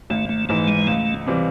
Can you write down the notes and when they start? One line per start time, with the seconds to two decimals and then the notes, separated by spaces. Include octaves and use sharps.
0.10 G#1 A3
0.29 A3
0.49 G#2 E3 A3
0.68 G#3
0.87 C#2 A3
1.26 C3 E3 G3 C4